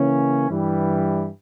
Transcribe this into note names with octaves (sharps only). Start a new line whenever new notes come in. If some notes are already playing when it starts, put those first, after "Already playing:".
Already playing: C#3 E3 A#3 C#4
G2 E3 G3